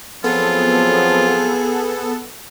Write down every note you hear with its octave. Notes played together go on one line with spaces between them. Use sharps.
F3 F#3 B3 C4 F4 G#4 A4